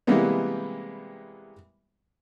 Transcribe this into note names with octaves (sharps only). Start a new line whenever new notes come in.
C3 E3 G3 G#3 A#3 B3